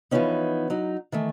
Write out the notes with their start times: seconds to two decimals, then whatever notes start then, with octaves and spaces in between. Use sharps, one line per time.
0.11 E3 F3 A3 B3 C#4 D#4
0.70 F#3 D#4
1.12 D#3 E3 A3